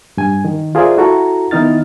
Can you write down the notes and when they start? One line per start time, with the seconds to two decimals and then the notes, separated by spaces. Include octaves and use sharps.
0.17 G2 G#5
0.45 D#3
0.75 F4 G#4 A#4 C5 D5 E5
0.98 E4 F#4 A4 A#5
1.51 D#3 B3 D#4 E4 F6 A6